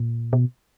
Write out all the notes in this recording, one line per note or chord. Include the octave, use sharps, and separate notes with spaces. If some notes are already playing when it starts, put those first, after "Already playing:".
Already playing: A#2
B2